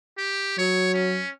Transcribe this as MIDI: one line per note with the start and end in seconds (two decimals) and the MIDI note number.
0.18 0.58 67
0.59 1.23 54
0.59 0.93 73
0.94 1.29 61